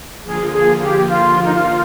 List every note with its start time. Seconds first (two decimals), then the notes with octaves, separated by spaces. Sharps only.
0.24 D3 F3 A#3 F4 G#4
0.52 G#4
0.81 G4
1.09 F4
1.44 D#4
1.53 F4